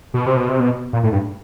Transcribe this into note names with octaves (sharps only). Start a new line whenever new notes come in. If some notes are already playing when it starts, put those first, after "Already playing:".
B2
C3
B2
C3
B2
A#2
A2
G2